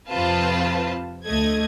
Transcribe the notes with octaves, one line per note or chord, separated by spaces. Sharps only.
F2 C3 C4 F4 B4 A5
D2 A3 D#5 G#6